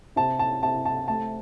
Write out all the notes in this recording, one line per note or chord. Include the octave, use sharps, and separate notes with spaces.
C3 A5
A5
C3 A5
A5
A3 A5